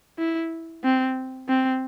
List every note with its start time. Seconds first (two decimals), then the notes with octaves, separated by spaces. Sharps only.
0.19 E4
0.84 C4
1.49 C4